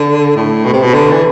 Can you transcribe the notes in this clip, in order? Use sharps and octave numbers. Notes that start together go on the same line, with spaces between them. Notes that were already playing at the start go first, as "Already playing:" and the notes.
Already playing: D3
A2
B2
C3
B2
D3
E3